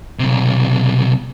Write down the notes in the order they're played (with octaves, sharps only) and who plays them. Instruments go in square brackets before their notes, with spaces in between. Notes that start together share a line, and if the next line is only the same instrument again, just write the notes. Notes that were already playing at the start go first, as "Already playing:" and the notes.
[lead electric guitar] B1 C3